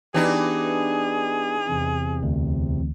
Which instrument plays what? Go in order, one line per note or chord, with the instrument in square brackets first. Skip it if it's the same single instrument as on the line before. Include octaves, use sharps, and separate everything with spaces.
[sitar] E3 D4 D#4 [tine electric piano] B3 G4 [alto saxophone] G#4
[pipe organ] E2 C3
[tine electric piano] D2